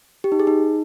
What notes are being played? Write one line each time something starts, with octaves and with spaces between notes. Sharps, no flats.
G4
D#4
G#4
D#4